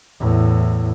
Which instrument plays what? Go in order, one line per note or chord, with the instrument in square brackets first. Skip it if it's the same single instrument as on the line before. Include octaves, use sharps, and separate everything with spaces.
[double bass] E2 A2